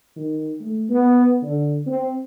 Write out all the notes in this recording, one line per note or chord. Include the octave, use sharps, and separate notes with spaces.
D#3
A3
B3
D3
C4